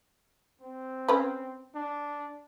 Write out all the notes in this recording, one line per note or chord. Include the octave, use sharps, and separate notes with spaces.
C4
C#4 B4
D4